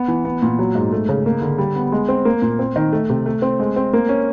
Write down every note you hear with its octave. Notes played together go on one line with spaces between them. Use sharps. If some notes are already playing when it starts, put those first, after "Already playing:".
Already playing: B3
E3
B3
A#2
F#3
G#2
A3
C#3
A#3
D3
G3
B3
G#3
C4
A#3
A#2
C4
D#3
A3
C3
A3
C4
G#3
C4
A#3
C#4